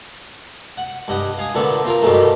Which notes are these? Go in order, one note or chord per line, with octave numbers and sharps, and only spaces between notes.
F#5
G2 D#5 F#5
F5 G#5 D#6
A#2 D3 A3 B3
C4 F4 A#4
G2 B2 D#3 E3 A3